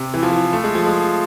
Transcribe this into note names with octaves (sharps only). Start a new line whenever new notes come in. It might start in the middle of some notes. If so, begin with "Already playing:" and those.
Already playing: C3
E3
F3
E3
A3
G#3
F3
G#3